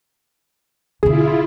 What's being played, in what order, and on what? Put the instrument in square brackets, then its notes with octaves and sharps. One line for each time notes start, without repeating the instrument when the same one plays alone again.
[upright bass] B2 D3 [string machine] E4 F4 [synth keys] G#4